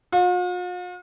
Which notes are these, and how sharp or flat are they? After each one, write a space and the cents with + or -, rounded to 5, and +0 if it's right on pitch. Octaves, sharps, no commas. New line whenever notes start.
F4 +45